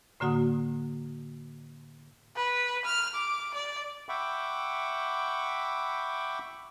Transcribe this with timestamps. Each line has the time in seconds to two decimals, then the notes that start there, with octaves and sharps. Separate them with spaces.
0.20 A2 D3 A#3 F#4 F#5 D#6
2.36 B4
2.85 F6
3.14 D6
3.54 D5
4.09 E5 F#5 G5 B5 C#6 D6